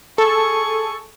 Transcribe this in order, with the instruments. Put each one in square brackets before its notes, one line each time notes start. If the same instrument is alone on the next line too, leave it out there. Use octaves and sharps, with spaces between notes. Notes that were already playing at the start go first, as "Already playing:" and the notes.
[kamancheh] G#4 C#6 [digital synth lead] A4